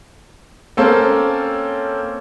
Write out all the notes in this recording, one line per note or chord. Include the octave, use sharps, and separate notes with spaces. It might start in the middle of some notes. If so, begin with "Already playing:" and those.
A#3 C4 C#4 A4